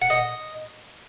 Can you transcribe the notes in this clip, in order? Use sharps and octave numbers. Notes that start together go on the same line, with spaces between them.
F#5
D#5